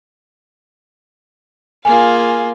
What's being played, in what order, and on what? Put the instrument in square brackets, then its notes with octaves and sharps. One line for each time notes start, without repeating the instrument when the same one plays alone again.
[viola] A#3 F4 [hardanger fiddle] G#4 F5 [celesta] G#5